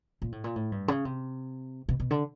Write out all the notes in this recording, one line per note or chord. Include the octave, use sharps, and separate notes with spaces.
A#2
A2
A#2
A2
G2
C#3
C3
B2
B2
D3